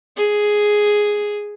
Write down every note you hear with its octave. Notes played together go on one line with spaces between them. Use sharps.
G#4